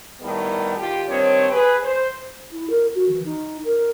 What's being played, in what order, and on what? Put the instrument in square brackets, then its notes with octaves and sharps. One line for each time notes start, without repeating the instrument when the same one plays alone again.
[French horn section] A2 D#3 G3 B3
D#2 F4 G4
G2 D#3 C4 C#5
G#4 B4
C5
[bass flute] E4
A#4
F#4
E3
D#4
A#4